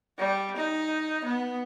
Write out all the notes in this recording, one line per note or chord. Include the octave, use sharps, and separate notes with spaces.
G3
D#4
B3